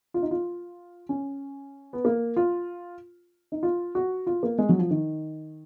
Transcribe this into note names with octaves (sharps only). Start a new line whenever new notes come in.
F4
D#4
F4
C#4
B3
A#3
F4
D#4
F4
F#4
F4
A#3
G#3
F#3
F3
D#3